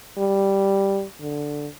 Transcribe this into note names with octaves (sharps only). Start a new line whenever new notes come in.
G3
D3